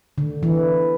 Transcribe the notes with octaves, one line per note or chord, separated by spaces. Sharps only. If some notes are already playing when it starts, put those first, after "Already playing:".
D3
E3